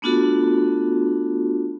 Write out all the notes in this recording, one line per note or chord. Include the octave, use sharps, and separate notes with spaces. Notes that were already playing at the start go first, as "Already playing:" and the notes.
A3 B3 D4 F4 F#4 A4